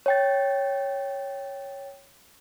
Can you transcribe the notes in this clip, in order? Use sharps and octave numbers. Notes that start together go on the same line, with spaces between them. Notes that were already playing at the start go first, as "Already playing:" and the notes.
C#5 G5 A6